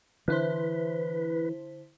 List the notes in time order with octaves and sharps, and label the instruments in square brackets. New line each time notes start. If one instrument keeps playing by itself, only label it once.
[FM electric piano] D3 E4 C5 [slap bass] E3 [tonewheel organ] B4